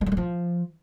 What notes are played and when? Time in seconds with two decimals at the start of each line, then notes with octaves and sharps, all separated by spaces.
0.01 G#3
0.06 F#3
0.12 G#3
0.17 F3